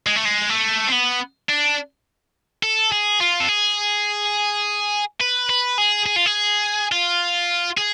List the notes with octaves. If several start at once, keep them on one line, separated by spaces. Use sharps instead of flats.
G#3
A3
G#3
A3
C4
B3
D4
A4
G#4
F4
A4
G#4
B4
B4
G#4
G#4
F4
G#4
F4
G#4